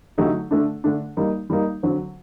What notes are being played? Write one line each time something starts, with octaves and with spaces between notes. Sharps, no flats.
D3 F#3 A3 D#4 G4
D3 A3 D4
D3 A3 D4
G3 A#3 D#4
G3 A#3 D#4
D3 F#3 C4